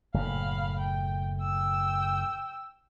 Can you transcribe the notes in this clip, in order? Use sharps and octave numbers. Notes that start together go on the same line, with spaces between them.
F#1 A2 F5 B5
G5
G5 E6